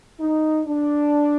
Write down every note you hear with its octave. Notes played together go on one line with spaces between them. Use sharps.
D#4
D4